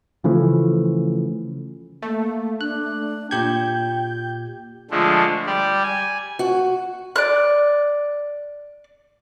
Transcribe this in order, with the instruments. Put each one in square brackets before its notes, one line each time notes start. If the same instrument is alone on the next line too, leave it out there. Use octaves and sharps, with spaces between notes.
[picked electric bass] C#3 E3 F3 A3
[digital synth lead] A3 [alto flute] A#3
[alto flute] D4 [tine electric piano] F#6
[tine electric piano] A#2 G4 G#6 [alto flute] G5 [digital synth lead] G6
[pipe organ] D3 F3 G#3 A3
G3 G4 D5
G#5
[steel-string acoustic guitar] F#4
[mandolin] D5 F#6